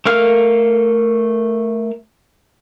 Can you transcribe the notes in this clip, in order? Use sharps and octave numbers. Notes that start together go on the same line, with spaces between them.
A3 A4 A#4 F5 F6